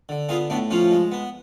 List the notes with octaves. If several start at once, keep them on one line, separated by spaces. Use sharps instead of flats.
D3
B3 F4 G#4
A2 B3 D4
F3 C#4 F4
G#3
B3